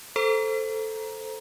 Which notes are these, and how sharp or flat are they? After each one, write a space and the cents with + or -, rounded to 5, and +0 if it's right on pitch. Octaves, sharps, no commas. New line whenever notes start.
A4 +0 C5 +0 A#5 +15